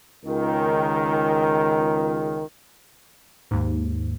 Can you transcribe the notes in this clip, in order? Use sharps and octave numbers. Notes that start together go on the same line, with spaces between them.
C#2 D#3
D#2 G#2